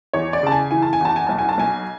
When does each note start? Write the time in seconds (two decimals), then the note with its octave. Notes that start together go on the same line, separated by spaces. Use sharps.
0.13 E2 C#5
0.33 D5
0.43 C#3 A5
0.52 G#5
0.71 E3 G#5
0.82 A5
0.93 G#5
1.01 E2 A5
1.16 G#5
1.27 B1 A5
1.38 G#5
1.49 A5
1.58 B1 G#5